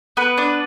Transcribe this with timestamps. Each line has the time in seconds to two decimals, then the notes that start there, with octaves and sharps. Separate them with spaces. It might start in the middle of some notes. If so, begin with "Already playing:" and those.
0.17 B3 B4
0.38 D4